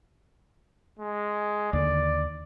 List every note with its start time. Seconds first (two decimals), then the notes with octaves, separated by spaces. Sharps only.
0.99 G#3
1.73 D#2 D3 D5